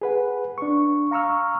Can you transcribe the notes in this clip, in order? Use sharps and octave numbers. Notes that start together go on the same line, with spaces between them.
G#4 B4 F#5
D4 C#6
F5 A#5 C#6 E6 F6